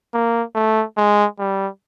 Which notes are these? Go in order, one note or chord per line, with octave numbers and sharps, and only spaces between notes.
A#3
A3
G#3
G3